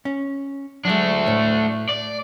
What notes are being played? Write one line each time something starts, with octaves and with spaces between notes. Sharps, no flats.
C#4
F#3 G#3 A3 D4
A2 C#5
D5